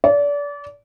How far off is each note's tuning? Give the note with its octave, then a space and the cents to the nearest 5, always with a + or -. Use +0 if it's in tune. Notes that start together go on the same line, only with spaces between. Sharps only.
D5 -30